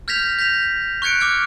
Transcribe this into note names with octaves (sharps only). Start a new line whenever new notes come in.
F6 G6 G#6 A#6 B6 F7
G6 A#6 B6 F7
C#6 F#6 G#6 C#7 D7
D6 F6 G#6